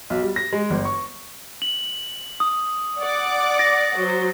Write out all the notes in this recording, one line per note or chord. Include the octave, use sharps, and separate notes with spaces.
B1
G3
A#6
G#3
G1
C#6
F#7
D#6
D5 F#5 D6
A6 A#6
F#3 C5